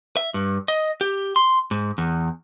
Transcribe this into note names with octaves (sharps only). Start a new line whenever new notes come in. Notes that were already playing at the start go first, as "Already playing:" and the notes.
E5
G2
D#5
G4
C6
G#2
E2